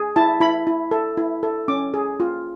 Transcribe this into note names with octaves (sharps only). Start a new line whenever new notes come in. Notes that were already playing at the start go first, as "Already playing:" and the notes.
Already playing: G#4
E4 A5
E4 B5
E4
A4
E4
A4
C#4 D6
G#4
F4